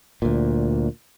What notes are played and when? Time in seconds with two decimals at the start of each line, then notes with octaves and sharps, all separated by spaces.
0.22 D2 A#2